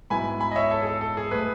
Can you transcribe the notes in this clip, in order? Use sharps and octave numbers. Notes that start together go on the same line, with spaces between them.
G#2 F#3 B3 E4 G#5 B5
G#5 B5
D#5
C#5 E5
A4 C#5
G#4
A4
A4
G#4
A2 G#3 G#4 B4